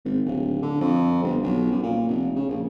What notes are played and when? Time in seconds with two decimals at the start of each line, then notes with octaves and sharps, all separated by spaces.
0.05 G#1
0.26 D1
0.62 D3
0.81 F2
1.23 G1
1.43 B1
1.71 F#2
1.83 A#2
2.08 F1
2.35 C#3
2.49 A#1